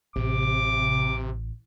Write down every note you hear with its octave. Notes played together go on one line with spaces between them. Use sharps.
A1 C3 D6